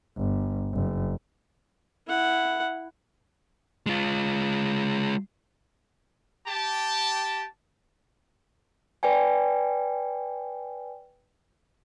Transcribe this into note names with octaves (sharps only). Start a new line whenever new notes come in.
G1
F#1
E4 F#5
G#3 F4
G4 A5
B4 D5 G5 G#5